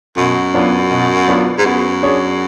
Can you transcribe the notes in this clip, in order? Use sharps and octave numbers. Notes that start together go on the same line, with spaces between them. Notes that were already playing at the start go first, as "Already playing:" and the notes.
F#2 B2
F#3 B3 D4 F4
B2
F#3 B3 D4 F4
G#2
F#2 B3
D4 G#4 C#5